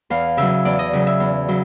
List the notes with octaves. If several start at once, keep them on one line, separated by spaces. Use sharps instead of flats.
E2 F5
C#3 F#3 E5
E2 D5
D#5
C#3 F#3
E5
E2
C#3 F#3